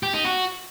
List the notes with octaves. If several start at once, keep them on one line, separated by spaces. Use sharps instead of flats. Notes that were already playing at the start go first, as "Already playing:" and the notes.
G4
D#4
F#4